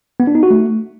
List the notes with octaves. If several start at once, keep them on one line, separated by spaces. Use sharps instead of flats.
B3
D4
D#4
F#4
A3